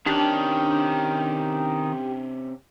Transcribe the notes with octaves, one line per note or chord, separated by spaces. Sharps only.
C3 D#3 C#4 D4 G4